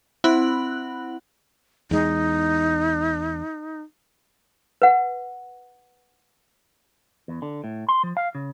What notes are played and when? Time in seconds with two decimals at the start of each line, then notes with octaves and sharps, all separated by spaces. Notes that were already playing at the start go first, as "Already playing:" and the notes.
0.24 C4 E4 F#5 B5 F#6 F#7
1.91 E2 G#3 D#4
4.82 B4 F#5
7.28 E2
7.42 D3
7.64 A2
7.89 C6
8.03 F3
8.17 F5
8.35 C#3